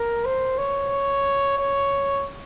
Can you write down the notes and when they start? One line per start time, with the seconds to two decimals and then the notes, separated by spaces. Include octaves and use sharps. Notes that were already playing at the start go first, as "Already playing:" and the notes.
Already playing: A#4
0.25 C5
0.58 C#5
1.58 C#5